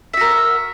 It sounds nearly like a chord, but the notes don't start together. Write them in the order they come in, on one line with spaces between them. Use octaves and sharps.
E5 F#4 A#4